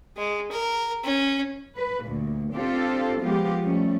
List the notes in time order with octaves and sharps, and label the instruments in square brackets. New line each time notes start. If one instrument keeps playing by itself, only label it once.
[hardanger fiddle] G#3
A#4
C#4
[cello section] B4
D2 A#2
C4 D4 F4 G4 A4 C5
F3 G#3 B3 F4 G4
F3 G3 A3 C#4